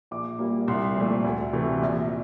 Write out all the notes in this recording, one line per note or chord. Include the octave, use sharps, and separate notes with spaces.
A#1 D6
A#2 G3 A#3
C2 C6
A#2 F3 A3
D2
C3 E3 A3
A#1